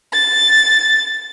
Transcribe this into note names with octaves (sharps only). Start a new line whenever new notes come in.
A6